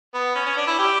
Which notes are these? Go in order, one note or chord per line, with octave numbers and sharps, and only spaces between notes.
B3
C#4
C#4
D4
E4
G4